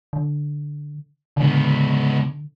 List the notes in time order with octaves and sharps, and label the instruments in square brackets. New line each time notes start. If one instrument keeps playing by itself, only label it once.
[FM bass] D3
[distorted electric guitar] C#2 B3 [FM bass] D3